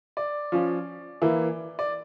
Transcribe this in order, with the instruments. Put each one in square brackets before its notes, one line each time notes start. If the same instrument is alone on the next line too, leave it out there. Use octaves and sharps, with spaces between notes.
[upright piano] D5
F3 C#4 F4
E3 A#3 E4
D5